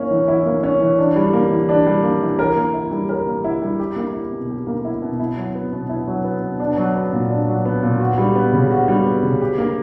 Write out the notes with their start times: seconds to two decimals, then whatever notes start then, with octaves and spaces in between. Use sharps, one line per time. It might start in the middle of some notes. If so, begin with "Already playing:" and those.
Already playing: A#3 C#4 E4
0.11 E3
0.28 E4
0.46 A#3
0.63 C#4
0.81 E3
0.98 D4
1.16 G3
1.33 A#3
1.51 E3
1.69 D4
1.86 G3
2.04 A#3
2.22 E3
2.39 A#4
2.56 A#3
2.74 E4
2.91 G3
3.09 A#4
3.27 A#3
3.44 E4
3.62 G3
3.79 G4
3.96 A#3
4.14 E4
4.32 B2
4.50 G4
4.67 A#3
4.85 E4
5.02 B2
5.20 E4
5.37 F#3
5.55 B3
5.72 B2
5.89 E4
6.07 F#3
6.24 B3
6.42 B2
6.60 D4
6.77 F#3
6.95 B3
7.13 A#2
7.30 D4
7.48 F#3
7.65 B3
7.83 A#2
8.00 F#4
8.18 G3
8.35 B3
8.53 C#3
8.71 F#4
8.88 G3
9.05 B3
9.23 C#3
9.41 G4
9.58 A#3